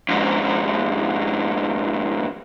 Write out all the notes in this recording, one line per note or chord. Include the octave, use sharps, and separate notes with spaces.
F2 G#2